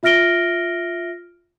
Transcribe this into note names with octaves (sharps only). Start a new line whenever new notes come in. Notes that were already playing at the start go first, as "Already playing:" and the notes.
F4 E5 F6 A#6 D7 G7